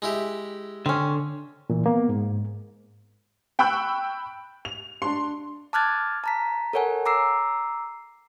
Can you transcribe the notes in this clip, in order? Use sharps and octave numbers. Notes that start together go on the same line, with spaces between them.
G#3 E4 G4
D3 C4 C#4
A#2 E3
A#3 B3
G#2
G5 B5 C#6 E6 F#6 G6
F7
D4 C6
A5 D6 F6 F#6 G#6 A6
A5 A#5 B6
A4 A#4 C#5 F#5 G#5
A#5 D6 E6 C7